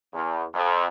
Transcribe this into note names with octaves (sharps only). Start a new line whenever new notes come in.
E2
F2